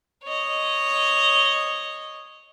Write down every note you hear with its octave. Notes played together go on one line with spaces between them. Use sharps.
C#5 D#5